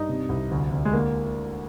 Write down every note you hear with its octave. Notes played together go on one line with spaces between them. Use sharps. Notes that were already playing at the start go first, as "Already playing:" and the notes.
Already playing: G2 D#4
C3
C2
D2
D2
G#3
D3 A#3